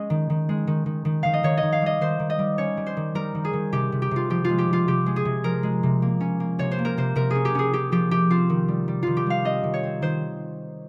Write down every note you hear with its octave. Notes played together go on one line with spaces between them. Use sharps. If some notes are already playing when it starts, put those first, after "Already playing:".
Already playing: G#3 C#4 D#5
D#3
D#3
G#3
D#3
D#3
D#3
D#3 F5
D#5
D#3 C#5
D#5
D#3
F5
G3 D#5
D#3 C5
D#3
D#5
G3
C#4 C#5
G3
C5
D#3
G3 A#4
D#3
G#4
D#3
C3 G4
C3
G4
C3 F4
F3 G4
G#3 F4
G4
C3
F4
C3 G4
G#3
G#4
C3
F3 A#4
G#3
C3
A#3
C#4
A#3
C3 C#5
C5
A#3
A#4
C3 C5
C3 A#4
C#4 G#4
G4
C#4 G#4
C#4 G4
F3 G4
C3 G4
C4 F4
D#3
G3
G3
D#3 F4
G4
G3 F5
C4 D#5
D#3
C#5
C4
D#3 C5